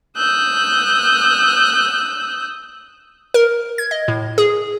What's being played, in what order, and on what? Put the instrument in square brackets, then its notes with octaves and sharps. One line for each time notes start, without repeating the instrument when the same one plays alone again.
[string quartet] D#6 E6 F#6 G6
[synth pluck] A#4
G#6
D#5
A2
G#4